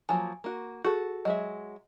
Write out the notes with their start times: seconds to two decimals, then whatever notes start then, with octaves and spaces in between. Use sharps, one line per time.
0.09 F3 F#3 A#3 G#5
0.44 A#3 F#4
0.85 F#4 G#4 A4
1.25 F#3 G#3 D#5 E5